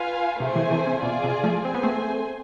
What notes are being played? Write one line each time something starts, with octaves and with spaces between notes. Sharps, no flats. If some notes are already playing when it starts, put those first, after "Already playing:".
Already playing: F4 B4 F5 G#5
C3 A3 E4 G#4 C5 G#5
C3 E3
C3 E3
C3
B2 F4 G#4 D5 G#5
C3
F3 A3
C4 G#4 C5 G#5
B3
A3 C4